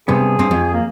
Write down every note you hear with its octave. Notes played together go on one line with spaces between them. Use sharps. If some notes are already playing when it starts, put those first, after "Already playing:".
G2 C3 B3 G#4
G2 C4
F2
A#3